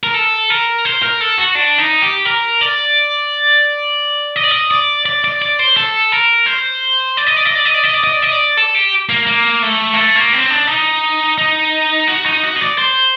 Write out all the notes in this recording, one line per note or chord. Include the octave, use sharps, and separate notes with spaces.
A#4
A4
A#4
C5
A#4
A4
F#4
D4
D#4
G4
A#4
D5
D#5
D5
D#5
D5
D5
D5
D5
C5
A4
A#4
C5
D5
D#5
D5
D#5
D5
D#5
D5
D#5
D5
D#5
D5
D#5
D5
A4
G4
A#3
A#3
A3
A#3
A3
A#3
C4
D4
D#4
D#4
F#4
D#4
F#4
D#5
D5
C5